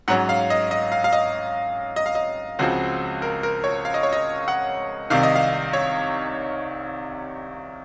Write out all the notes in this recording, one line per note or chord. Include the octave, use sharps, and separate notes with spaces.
G#2 F#3 C#4 F#5
F5
D#5
D#5
F5
F5
D#5
D#5
F5
D#5
C#2 C#3 F3 C4 F#4
A#4
A#4
C#5
F5
D#5
C#5
D#5
F#5
C2 C3 D#3 F5
D#5
F5
C#5